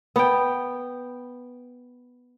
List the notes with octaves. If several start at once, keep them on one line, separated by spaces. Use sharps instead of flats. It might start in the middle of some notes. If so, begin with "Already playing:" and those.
B3 G5